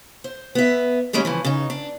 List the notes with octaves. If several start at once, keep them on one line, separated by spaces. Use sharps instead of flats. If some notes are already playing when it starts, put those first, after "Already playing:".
C5
B3 E5
D#3 G3 G#3 A#3 C#4 D#4
C#3 E3 F3
C#3 D#4
D4